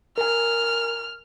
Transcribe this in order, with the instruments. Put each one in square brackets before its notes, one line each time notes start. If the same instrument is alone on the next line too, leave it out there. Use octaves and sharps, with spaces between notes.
[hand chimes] A#4 G#5 [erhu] F6